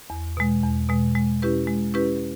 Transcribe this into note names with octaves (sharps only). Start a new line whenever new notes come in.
E2
B2 G#3
E2
B2 G#3
G#3
C#4 E4 G4 B4
G#3
C#4 E4 G4 B4